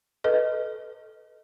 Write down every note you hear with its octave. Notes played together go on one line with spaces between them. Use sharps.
A4 B4 D#5